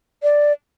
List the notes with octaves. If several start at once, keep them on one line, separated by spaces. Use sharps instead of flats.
D5